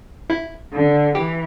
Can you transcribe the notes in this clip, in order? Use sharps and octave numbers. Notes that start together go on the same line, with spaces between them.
E4 E5
D3
E3 G4 G5